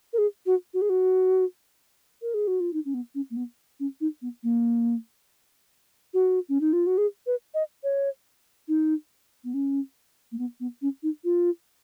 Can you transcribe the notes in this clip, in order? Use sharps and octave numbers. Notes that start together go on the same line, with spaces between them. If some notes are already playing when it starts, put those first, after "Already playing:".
A#4
G#4
F#4
F#4
G#4
F#4
A#4
G#4
F#4
F4
D#4
C#4
B3
C#4
A#3
B3
C#4
D#4
B3
A#3
F#4
C#4
D#4
F4
F#4
G#4
B4
D#5
C#5
D#4
B3
C#4
A#3
B3
B3
C#4
D#4
F4